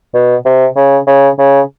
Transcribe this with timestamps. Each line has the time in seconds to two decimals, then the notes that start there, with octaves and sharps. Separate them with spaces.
0.14 B2
0.45 C3
0.76 C#3
1.07 C#3
1.39 C#3